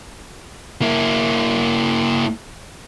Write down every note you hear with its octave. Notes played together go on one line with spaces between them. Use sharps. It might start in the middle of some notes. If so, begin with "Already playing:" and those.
A#3 E4